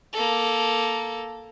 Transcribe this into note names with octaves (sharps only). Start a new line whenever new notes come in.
A#3 A4